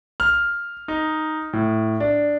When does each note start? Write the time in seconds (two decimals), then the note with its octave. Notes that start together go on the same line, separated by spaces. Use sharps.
0.20 F6
0.88 D#4
1.53 A2
2.00 D4